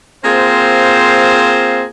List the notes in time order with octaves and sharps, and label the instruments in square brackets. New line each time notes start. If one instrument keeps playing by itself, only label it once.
[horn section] A#3 C4 F4 G#4 C5